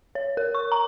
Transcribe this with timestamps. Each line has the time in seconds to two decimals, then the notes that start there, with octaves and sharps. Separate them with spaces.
0.15 C#5
0.37 A#4
0.55 C#6
0.72 A#5